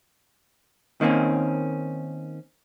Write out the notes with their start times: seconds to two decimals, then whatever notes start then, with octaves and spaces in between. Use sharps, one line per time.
1.01 D#3 A#3 C4 C#4